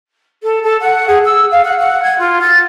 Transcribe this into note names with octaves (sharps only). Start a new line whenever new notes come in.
A4
A4
F#5
G#4
E6
F5
F#5
F#5
G#6
F4
A6